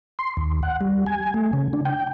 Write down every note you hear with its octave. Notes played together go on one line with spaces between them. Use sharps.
C6
D#2
F#5
G3
G#5
A3
C#3
D4
G5